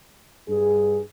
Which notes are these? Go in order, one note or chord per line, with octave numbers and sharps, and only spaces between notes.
G2 G#4